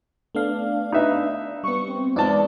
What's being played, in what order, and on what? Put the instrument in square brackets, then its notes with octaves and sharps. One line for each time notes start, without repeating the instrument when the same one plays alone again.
[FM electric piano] A3 B3 F5 [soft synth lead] D4
[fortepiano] D#4 B4 E5
[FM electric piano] G3 B3 [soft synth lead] C#6
[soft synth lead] C4
[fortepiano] E2 A5 [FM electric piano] G#3 C4 D#4 [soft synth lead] D5